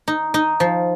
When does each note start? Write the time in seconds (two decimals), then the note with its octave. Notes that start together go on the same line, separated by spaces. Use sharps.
0.08 D#4
0.34 D#4
0.60 F3